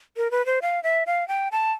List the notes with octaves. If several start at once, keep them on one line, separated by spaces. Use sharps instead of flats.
A#4
B4
C5
F5
E5
F5
G5
A5